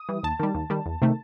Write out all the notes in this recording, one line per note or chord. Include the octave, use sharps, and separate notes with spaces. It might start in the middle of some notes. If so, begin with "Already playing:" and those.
Already playing: D#6
E3 G3
D#2 A5
D#3 G3
D#2
D#3 G3
E2
C3 D#3 A3